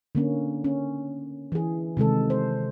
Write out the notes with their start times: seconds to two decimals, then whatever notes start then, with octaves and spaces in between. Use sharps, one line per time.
0.15 D3 A#3 C#4
0.64 C#4
1.52 E3 G#4
1.97 C3 D#3 G#3 A4
2.30 C5